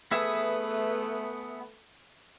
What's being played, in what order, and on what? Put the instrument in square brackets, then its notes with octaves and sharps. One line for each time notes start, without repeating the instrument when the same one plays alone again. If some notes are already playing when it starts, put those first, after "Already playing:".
[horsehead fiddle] A3 B4 [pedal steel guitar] B3 G#4 E5